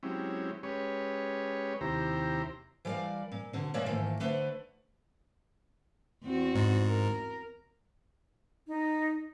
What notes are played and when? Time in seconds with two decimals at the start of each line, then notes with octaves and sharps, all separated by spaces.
0.03 F#3 G#3 C4 C#4 E4 G4
0.63 G#3 C#4 G4 B4 C#5
1.81 D#2 C3 E4 G4 C5 A#5
2.85 E3 G3 A4 A#4 D5 F5
3.32 A#2
3.53 B2 D3
3.74 A#2 G#3 A#3 C#5 D5 E5
3.86 G#2 D#3 E3 A3 A#3
4.20 D3 A3 B4 C5
6.23 E2 C4 F#4
6.55 G#2
6.86 A#4
8.68 D#4